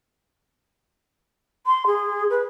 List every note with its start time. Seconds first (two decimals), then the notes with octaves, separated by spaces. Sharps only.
1.66 C6
1.86 G#4
2.30 B4